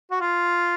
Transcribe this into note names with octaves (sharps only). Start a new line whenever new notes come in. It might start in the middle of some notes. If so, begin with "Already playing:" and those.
F#4
F4